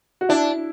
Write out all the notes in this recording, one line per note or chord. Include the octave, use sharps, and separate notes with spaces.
F#4
D4 E4